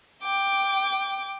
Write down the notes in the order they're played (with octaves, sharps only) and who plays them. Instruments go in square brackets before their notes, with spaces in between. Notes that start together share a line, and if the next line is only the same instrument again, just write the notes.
[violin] G5 D6